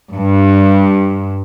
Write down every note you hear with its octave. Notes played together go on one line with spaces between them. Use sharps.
G2